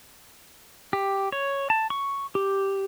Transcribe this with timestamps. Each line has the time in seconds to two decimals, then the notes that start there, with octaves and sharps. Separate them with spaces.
0.93 G4
1.32 C#5
1.70 A5
1.90 C#6
2.35 G4